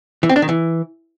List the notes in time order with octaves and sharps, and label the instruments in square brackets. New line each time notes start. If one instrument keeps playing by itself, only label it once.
[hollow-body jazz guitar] E3
C4
D4
D#3
E3